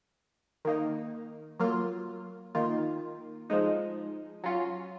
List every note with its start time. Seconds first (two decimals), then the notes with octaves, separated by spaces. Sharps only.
0.65 D#3 A#3 D#4
1.60 F#3 A#3 F4
2.55 D#3 A#3 F4
3.50 F3 G#3 D#4
4.44 F#3 C#4 F4